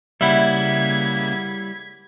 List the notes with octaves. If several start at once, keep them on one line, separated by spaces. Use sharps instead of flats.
C#3 G3 A#3 E4 E5 F#5 G#6 B6